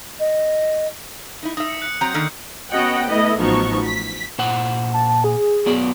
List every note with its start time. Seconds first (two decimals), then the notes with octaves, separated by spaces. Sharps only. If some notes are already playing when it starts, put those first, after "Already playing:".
0.19 D#5
1.43 D#4 E4
1.57 D#4 E5 D#6
1.69 C#7
1.82 F#6 C#7
2.01 F#3 C4 A#5 G6
2.14 D3 D#3 A#3
2.71 B3 C#4 F#4 D#5 F#5 G5
3.08 A3 B3 E4 B4 D#5
3.38 A1 F3 F#3 B3 D#4 C#6
3.85 B6
4.39 A#2 C5 F#5
4.94 A5
5.24 G#4
5.66 F#3 B3 D5